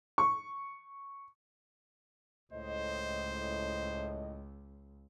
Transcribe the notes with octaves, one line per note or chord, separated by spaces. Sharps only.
C#6
C#2 A2 C5 D#5